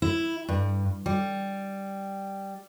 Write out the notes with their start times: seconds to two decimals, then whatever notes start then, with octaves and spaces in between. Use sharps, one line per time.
0.02 E4
0.48 G2
1.06 G3